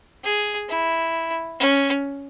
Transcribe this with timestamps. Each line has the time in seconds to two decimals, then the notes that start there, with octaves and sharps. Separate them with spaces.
0.24 G#4
0.69 E4
1.59 C#4